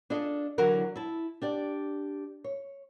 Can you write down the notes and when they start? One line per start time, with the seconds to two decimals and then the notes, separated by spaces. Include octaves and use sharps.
0.10 D4 F4 G#4 A4 D#5
0.58 D3 E3 F#3 A#4 F#5
0.96 E4 A5
1.42 D4 G4 D5
2.44 C#5